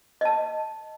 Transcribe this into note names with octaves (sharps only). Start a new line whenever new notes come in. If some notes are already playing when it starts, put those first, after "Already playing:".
D#5 A5